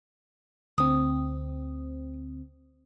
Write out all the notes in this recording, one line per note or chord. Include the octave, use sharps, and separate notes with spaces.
D2 C4 D#6